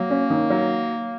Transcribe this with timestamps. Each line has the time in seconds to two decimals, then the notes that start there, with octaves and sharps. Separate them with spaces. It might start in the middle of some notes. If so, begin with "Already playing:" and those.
Already playing: F#3 A#3
0.10 C#4
0.30 D#3
0.50 F#3